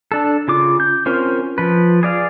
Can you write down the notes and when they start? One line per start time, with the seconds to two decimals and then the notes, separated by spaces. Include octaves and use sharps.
0.12 D4 A4
0.48 C#3 F4 D6
0.80 G6
1.06 C4 C#4 F4 A#4 C5
1.58 F3 B4
2.03 G#4 D5 F5